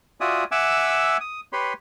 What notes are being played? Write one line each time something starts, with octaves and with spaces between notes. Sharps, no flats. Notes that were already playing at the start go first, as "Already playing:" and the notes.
F4 F#4 D5 E5 G#5 D#6
E5 F#5 G#5 D6 E6
D#6
G4 B4 C#5 B5 C6